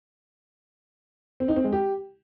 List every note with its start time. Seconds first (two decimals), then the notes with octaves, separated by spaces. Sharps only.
1.40 C4
1.48 D#4
1.56 C4
1.64 G#3
1.73 G4